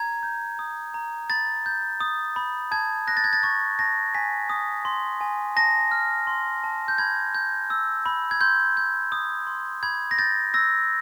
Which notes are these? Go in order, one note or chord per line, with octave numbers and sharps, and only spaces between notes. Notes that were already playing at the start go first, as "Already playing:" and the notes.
Already playing: A#5 G#6
G6
D#6
A#5
B5 A6
G6
D#6
B5
A5 G#6
F#6 A#6
A6
G#6
A6
C#6 A6
A5 A#6
G#5 B6
D#6
C6
G#5
A5 A#6
F6
C6
A5
G6
B5 G#6
G6
E6
B5
G#6
C6 G6
G6
D#6
C6
B5 G#6
A#6
G6 A6
E6 A#6